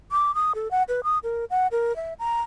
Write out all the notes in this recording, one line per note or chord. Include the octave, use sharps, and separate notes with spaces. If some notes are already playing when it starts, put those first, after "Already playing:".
D6
D#6
A4
F#5
B4
D#6
A#4
F#5
A#4
E5
A#5